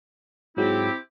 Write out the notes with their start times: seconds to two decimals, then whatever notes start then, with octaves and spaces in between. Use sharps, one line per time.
0.57 G#2 F#3 G#3 C4 E4 G4